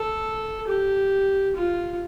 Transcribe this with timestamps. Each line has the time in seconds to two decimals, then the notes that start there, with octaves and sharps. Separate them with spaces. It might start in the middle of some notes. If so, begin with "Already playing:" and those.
Already playing: A4
0.68 G4
1.56 F4